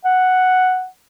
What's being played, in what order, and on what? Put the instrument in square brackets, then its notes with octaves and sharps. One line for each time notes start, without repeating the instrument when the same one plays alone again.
[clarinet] F#5